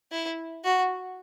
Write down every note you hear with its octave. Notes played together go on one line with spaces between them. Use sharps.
E4
F#4